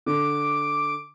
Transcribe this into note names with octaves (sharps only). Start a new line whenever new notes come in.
D3 D6